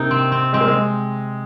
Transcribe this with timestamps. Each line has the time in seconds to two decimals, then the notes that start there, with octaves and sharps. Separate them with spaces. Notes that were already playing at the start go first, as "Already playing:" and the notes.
Already playing: C3 A#3 D#4
0.11 C4
0.32 C4
0.53 G#3 C4
0.61 A#3
0.68 G#3